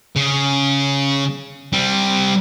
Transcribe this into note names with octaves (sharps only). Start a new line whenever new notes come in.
C#3
G3 C4